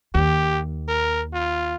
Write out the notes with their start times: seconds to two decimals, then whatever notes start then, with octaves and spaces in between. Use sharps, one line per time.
0.15 D#2 G4
0.88 A#4
1.33 F4